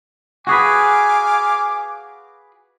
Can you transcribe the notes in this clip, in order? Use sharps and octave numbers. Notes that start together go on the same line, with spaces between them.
F#4 G#4 B4 F5 G#5 D6